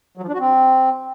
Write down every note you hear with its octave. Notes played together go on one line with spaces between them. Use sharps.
F#3
F3
D4
F#4
C4